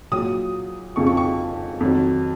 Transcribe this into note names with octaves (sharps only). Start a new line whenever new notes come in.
A#2 F#3 D#6
F2 C#3 F3 C#6
C#6
C#6
F2 D#3 F#3